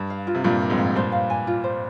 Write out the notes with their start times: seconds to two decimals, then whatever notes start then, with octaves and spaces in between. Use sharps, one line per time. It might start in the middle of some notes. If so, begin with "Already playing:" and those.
Already playing: G2
0.10 F5
0.27 F4
0.35 C3
0.44 G2 A#2 F4
0.62 A#4
0.70 F2 G#2
0.78 F5
0.96 G2 A#2 C5
1.12 F5
1.30 G#5
1.47 F4
1.64 C5